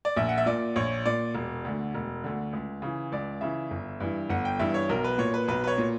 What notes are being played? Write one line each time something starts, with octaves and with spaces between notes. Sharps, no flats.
D5
A#1 E5
F#5
E5
A#2 D5
A#1 C#5
A#2 D5
E1
D2 D3
E1
D2 D3
C#2
C#3 E3
C#2 D5
C#3 E3 E5
G1
G2 E3
G1 F#5
G5
G2 E3 E5
C#5
B1 A#4
B4
A#2 C#5
B4
B1 B4
B4
C#5
A#2